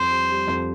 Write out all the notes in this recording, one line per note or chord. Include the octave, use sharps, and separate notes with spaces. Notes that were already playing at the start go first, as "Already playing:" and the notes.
Already playing: F2 C5
G3
G3
F2